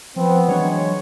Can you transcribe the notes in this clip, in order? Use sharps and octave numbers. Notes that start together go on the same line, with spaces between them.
F3 B3 C4
E3 F#3 G#3 D4 C#5